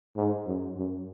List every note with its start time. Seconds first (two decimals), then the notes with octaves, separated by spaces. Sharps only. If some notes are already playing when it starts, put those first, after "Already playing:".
0.16 G#2
0.46 F#2
0.77 F#2